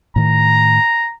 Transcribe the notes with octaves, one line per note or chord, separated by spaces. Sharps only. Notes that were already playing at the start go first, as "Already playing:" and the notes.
A2 D#3 A#5